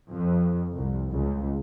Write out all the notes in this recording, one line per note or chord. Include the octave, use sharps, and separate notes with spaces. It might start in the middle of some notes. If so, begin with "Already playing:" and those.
F2
C2
C#2